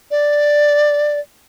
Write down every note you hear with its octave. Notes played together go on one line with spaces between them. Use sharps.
D5